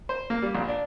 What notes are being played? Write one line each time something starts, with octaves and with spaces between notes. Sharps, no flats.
C5
A#3
G3
A#1
D4